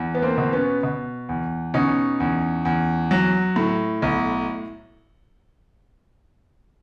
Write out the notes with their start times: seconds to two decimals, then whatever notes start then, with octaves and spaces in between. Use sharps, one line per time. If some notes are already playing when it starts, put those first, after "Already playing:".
Already playing: E2
0.15 B3
0.22 A#3 C4
0.38 B2
0.53 B3 C#4
0.83 B2
1.29 E2
1.74 B2 C#4 D#4
2.20 E2
2.65 E2
3.11 F#3
3.56 A2
4.02 B1